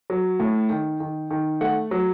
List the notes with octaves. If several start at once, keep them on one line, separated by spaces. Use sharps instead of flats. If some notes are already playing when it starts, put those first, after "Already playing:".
F#3
A2
D#3
D#3
D#3
A3 F#5
F#3